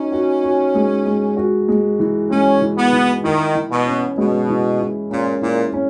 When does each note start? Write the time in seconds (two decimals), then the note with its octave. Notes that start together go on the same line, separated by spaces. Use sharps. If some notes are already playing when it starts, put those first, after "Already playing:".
Already playing: C#4 D#4 F#4
0.12 F#4
0.43 F#4
0.75 G#3
1.06 G#3
1.37 F#4
1.69 G#3
1.99 E3
2.30 G#3 C#4
2.61 E3
2.77 B3
2.93 E3
3.24 D#3 E4
3.55 E3
3.71 B2
3.87 C#4
4.18 B2 G#3
4.49 E3
4.80 E4
5.11 A#2 C#4
5.42 A#2 E4
5.74 C#4